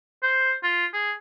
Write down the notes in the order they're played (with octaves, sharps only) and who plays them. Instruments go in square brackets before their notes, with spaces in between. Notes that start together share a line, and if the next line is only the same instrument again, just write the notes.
[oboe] C5
F4
G#4